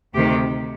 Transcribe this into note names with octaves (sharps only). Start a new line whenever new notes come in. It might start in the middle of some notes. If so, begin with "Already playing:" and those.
D2 C3 D#3 G4